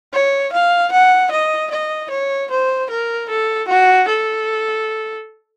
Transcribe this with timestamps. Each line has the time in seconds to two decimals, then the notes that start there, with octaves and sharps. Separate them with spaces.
0.13 C#5
0.53 F5
0.92 F#5
1.32 D#5
1.71 D#5
2.10 C#5
2.51 C5
2.90 A#4
3.29 A4
3.69 F#4
4.08 A4